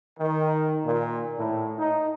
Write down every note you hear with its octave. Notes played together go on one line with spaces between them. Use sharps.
D#3
A#2
A2
D#4